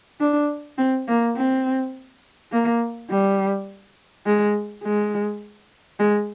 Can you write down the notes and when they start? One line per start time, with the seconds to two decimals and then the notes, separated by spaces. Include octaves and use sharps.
0.20 D4
0.78 C4
1.08 A#3
1.36 C4
2.52 A#3
3.10 G3
4.26 G#3
4.84 G#3
5.99 G#3